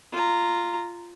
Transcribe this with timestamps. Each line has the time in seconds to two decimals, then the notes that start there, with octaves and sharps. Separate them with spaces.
0.12 F4 A#5